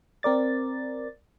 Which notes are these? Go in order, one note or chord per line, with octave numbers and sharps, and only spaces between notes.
C4 A#4 D5 A6